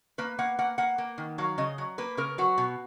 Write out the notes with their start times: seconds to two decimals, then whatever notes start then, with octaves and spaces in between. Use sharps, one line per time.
0.18 A#3 B4
0.39 A#3 F#5
0.59 A#3 F#5
0.78 A#3 F#5
0.98 A#3
1.18 D#3
1.38 F#3 F5
1.58 C#3 D#5
1.78 F#3
1.98 A#3 B4
2.17 C#3 A#4
2.38 F#3 F#4
2.58 B2